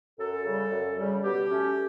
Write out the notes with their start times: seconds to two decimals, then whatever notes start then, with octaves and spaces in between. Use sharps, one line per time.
0.19 F#2 A4
0.45 C#3 G3
0.72 F#2
0.97 C#3 G3
1.23 B2 G4
1.50 A3 C#4